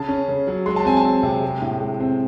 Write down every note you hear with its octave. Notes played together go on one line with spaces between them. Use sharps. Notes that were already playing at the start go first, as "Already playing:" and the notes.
Already playing: C#3 A5
C#4
C#3
F#3
G#3 C6
A5
C4 G#5
A5
C4
C3
G#3
A2
G#3
C4